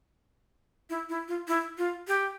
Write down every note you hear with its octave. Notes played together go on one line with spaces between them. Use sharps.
E4
E4
F4
E4
F4
G4